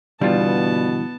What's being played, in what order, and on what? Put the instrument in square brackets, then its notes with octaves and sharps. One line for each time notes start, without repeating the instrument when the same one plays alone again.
[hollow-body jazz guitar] G2 D3 E3 [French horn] B2 [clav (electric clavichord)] G3 F4 [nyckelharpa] B3 A5